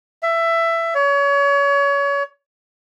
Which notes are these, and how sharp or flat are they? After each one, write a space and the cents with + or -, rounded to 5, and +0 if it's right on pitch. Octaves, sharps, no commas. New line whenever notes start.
E5 +15
C#5 +30